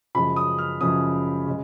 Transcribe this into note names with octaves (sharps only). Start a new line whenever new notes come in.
F#2 C#3 F3 G#3 B5
D#6
F6
F#2 C#3 F3 G#3 D#6
C#3 G#3